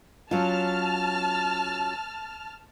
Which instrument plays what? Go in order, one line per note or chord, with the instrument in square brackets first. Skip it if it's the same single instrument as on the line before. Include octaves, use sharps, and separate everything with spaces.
[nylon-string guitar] F#3 C#4 F4 [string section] A5 F6